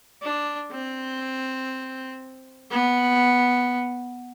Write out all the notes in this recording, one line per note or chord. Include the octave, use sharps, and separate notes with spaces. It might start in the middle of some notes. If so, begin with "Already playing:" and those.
D4
C4
B3